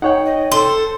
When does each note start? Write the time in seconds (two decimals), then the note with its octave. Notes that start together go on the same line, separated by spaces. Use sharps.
0.02 D#4 C#5 F#5 G5
0.26 D#5
0.52 A4 C5